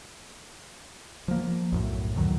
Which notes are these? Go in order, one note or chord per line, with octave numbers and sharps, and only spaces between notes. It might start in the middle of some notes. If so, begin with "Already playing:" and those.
F3 A#3
B1 F#2 A2
D2 A2 D#3 F#3